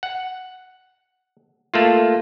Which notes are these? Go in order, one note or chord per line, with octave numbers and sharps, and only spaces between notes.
F#5
A3 A#3 F4